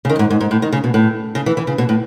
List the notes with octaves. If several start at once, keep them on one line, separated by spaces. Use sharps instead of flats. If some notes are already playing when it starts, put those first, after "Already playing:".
C#3
D#3
F#2
G#2
G#2
G#2
A2
D#3
C#3
B2
A2
C#3
E3
E3
C#3
B2
A2